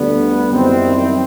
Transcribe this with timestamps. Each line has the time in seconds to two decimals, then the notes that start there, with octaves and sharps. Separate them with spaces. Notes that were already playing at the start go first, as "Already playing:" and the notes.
Already playing: D2 D3 G3 B3
0.50 F#2 D#3 G3 C4 E4